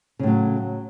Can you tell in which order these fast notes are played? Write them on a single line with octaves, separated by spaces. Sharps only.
C#3 A2 F#3